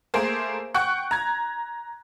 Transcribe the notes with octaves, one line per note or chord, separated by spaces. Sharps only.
A3 A#3 G#4 A#4 C5
F#5 G5 C#6 F#6
A#5 G#6